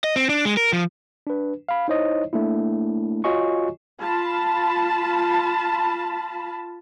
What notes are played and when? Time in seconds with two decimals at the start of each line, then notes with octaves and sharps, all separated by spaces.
0.04 D#5
0.16 C4
0.29 D4
0.45 G#3
0.57 A#4
0.73 F3
1.27 D4 B4
1.69 F5 B5
1.88 D#4 E4 C5 C#5 D#5
2.33 A3 A#3 D4 E4
3.24 F4 F#4 C#5 D#5 G#5 C#6
4.01 F4 A5 B5